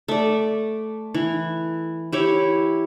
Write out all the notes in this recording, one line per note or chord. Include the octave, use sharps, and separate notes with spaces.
A3 D5
E3
E4 G4 C#5